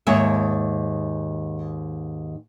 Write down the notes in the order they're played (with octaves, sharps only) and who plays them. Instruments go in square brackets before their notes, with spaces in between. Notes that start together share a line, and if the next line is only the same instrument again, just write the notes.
[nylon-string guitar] D#2 G#2 C#5 E5